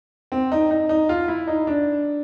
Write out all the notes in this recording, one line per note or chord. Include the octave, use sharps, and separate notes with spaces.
C4
D#4
D#4
D#4
F4
E4
D#4
D4